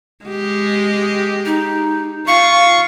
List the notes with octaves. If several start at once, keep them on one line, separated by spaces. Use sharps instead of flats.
G#3 G4
D#4
F4 F5 C#6